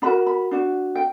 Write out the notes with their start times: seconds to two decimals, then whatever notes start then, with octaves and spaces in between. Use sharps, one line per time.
0.02 D4 F#4 A#4 B5
0.27 B5
0.51 D4 F#4
0.95 G5